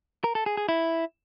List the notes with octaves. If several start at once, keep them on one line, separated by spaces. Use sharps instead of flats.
A#4
A4
G#4
G#4
E4